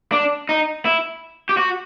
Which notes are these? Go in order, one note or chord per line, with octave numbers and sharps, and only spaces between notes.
D4
D#4
E4
G4
F#4